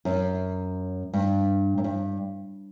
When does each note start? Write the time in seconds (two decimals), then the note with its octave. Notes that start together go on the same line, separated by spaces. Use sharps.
0.05 F#2
1.13 G2
1.78 F#2
1.84 G2